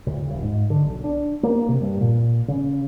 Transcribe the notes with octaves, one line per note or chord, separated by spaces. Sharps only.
C#2
D#1
G#2
D3
B1
D4
A#3
C3
G2
A#2
C#3